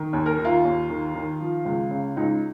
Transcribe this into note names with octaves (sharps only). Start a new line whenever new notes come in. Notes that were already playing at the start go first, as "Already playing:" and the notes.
Already playing: D#3
D#2
A#4
D#3
F4
D#2
D#3
D#3
F3
C#2
C#3
C#2 D#4